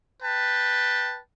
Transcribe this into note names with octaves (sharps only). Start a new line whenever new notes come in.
B4 G5 A5